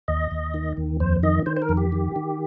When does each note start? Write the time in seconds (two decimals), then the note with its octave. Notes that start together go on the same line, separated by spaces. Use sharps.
0.08 D#2 D#5
0.31 D#2
0.54 D#3
0.77 D#2
1.00 F2 C5
1.23 D#3 D#5
1.46 D#3 C5
1.57 C5
1.62 A#4
1.69 F2
1.77 G4
1.92 D#3
2.16 D#3